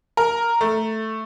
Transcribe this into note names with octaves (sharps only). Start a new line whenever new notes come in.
A#4
A3